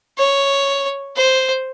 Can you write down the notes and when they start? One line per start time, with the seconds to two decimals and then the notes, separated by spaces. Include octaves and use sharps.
0.18 C#5
1.16 C5